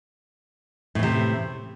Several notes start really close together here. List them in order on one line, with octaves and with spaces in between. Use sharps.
A2 E3 C3